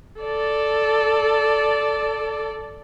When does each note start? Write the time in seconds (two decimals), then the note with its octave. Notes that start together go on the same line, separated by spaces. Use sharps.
0.21 A4 D5